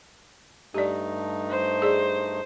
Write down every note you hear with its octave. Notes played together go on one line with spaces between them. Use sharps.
G2 A3 D#4 G4 D5
C5
G#4 D5